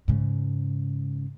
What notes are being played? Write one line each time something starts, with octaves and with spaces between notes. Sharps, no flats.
G#2 C#3